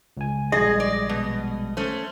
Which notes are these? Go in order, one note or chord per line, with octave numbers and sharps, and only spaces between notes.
C#2 G#5
A#1 G3 G#3 G#4 D#5
D5
B2
A3 C#4 C5